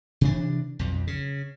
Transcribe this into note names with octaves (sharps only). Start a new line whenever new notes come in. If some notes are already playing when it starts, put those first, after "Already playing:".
C3 E3 D4
B1 F2
C#3